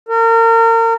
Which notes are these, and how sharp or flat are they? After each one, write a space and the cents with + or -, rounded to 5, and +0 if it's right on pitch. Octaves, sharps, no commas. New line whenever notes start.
A#4 -35